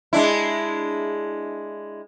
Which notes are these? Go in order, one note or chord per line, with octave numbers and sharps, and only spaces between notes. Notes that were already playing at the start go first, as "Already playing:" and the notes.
G#3 D4 E4